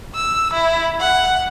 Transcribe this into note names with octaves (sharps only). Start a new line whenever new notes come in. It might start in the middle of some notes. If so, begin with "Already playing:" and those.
E6
E4
F#5